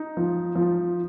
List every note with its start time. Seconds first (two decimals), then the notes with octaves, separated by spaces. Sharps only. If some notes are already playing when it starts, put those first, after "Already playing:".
Already playing: D#4
0.17 F3
0.55 F3